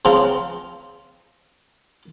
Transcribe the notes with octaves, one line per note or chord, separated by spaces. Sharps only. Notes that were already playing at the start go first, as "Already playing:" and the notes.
C#3 F3 C4 F4 A#5